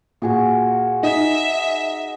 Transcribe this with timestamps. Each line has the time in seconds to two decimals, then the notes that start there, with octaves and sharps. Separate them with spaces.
0.22 A#2 F#4 G#4 C#6
1.03 D#4 E5